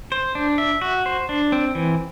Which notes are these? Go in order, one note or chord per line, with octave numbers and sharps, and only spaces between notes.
C5
D4
E5
F#4
C5
D4
C4
E3